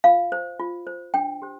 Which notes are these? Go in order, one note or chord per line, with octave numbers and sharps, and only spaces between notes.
F4 F5
C5
F4
C5
D4 G5
G4 C5